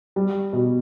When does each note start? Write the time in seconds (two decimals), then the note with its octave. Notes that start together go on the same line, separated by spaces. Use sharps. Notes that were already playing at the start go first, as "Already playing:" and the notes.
0.16 G3
0.53 B2